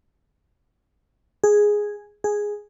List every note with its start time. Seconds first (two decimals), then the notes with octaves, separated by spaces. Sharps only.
1.44 G#4
2.24 G#4